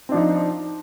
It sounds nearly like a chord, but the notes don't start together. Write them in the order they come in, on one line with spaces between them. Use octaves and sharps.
C4 D4 F3 D#4